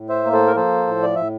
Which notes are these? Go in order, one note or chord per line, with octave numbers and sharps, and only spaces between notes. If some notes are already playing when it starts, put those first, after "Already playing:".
Already playing: A2
C5 E5
A#3
A4 C5
A#4
F3 A4 C5
A2
D5
A2 E5